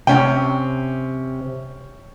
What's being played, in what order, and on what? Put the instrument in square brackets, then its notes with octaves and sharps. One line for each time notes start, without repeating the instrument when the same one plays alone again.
[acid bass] C3 [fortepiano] C#4 G5